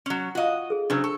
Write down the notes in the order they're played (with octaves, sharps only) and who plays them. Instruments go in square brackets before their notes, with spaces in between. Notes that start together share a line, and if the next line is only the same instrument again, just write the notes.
[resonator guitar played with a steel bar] F#3 C#4
[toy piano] F4 F5 D#6 [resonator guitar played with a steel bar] F#4 D#5
[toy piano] G#4 A4
[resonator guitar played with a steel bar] C#3 F#3 [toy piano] D4 C5 E6
[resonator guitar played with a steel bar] A4 [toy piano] C#6